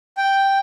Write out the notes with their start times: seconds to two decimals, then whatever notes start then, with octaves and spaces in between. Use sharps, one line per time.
0.17 G5